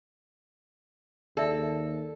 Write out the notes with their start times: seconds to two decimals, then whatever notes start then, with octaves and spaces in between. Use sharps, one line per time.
1.37 D#2 G#4 A4 D5 E5